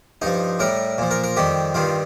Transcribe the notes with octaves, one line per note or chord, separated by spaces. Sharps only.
G2 F3 D#4
A2 G3 A#4
A#2 F3
A#4
A#4
F2 D#3 G3 G4
G2 D#3 G3 F4